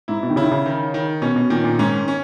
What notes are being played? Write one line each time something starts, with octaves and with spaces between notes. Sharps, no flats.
G#2 E4
B2
D#3
C#3 E4
D#3
C#3
D#3
D#3
B2 C#4
B2
A#2 D#3
A#2
G#2 C#4
C#4